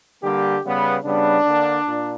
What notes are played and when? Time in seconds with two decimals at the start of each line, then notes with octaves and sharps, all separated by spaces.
0.23 D3 G3 A#3 G4
0.64 C#3 G3 B3
1.04 C#3 G3 B3 D4
1.45 D3 A#3
1.86 A#2